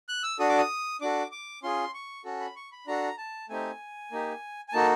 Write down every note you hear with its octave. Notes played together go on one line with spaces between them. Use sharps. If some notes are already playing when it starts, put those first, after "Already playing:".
F#6
E6
D4 F#4 A4 D#6
D6
D#6
D4 F#4 A4 D6
D6
C#4 F4 G#4 C6
C#6
C#4 F#4 A4
B5
C#6
B5
D4 F#4 A4 A#5
A5
A3 C4 D#4 G4 G#5
A#3 D#4 G4
G#5
A#3 D#4 F#4 A4 A5